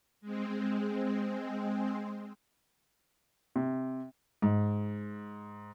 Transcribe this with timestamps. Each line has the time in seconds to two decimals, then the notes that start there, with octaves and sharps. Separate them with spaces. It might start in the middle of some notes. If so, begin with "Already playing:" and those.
0.21 G#3 C4
3.56 C3
4.42 G#2